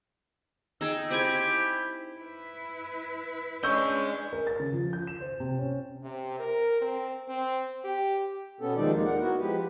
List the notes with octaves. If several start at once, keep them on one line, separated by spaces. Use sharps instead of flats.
D#4 G#4 G5 E6
C4 E4 G4 G#4 G#5
E4 B4
C#4 D4 G#4 D#5 C#6 E6 G6
A#4
A6
C#3
F3
G6
E7
C5
C3
C#4
C3
A#4
C4
C4
G4
B2 B3 C#4 A4
D#2 D#3 F3 G#3 D#4 D5
G#3 A#3 D#4
A#4 F#5
B3 E4 F#4
F3 G#3 G4 B4